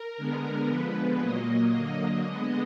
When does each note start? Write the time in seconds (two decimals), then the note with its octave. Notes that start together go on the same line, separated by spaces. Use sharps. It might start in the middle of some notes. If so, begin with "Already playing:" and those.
Already playing: A#4
0.17 D3 G#3 B3
0.69 D3 F3 G#3 B3 B4
1.21 A#2 F#3 A#3 D#5
1.72 D3 F#3 A#3 D#5
2.25 D3 G#3 B3